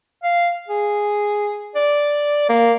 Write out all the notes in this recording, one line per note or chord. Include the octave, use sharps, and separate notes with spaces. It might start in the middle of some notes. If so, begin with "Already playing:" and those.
F5
G#4
D5
A#3